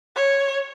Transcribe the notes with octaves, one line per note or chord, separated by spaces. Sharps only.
C#5